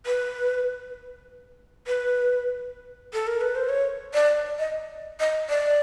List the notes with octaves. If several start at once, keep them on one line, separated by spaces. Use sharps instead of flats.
B4
B4
A4
A#4
B4
C5
C#5
D5
D#5
D#5
D5